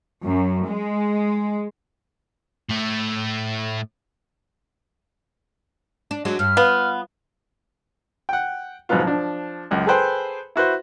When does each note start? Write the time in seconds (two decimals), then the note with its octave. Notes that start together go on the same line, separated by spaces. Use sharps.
0.24 F#2
0.67 G#3
2.69 A2 A3
6.11 D4
6.25 F#3 G#3 D4
6.39 G2 F6
6.57 B3 F4
8.29 F#5 G5
8.89 F2 G#2 B2 F#3 B3 F4
9.04 F3 D4
9.71 C#2 F#2
9.87 G#4 A4 B4 C5 G5
10.56 E4 F#4 B4 C5